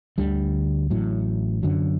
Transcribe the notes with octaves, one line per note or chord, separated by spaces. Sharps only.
D2 D3 G3
A1 A2 F#3
F#2 D3 F#3